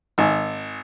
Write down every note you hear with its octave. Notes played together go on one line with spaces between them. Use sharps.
G#1